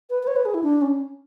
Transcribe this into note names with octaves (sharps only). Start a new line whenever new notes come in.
B4
B4
C#5
B4
G#4
E4
D4
C#4